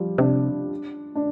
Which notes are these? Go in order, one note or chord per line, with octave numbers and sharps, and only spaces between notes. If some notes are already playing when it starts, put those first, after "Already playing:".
Already playing: F3 G3
C3 D4
D4